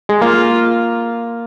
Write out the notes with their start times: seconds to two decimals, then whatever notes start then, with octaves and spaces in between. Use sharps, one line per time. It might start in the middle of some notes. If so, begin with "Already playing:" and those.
0.09 G#3
0.21 A#3 F4